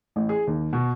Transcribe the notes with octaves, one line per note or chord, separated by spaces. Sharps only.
A1
G#4
D#2
B2